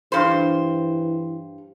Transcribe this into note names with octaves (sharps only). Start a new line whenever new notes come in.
G2 E3 C5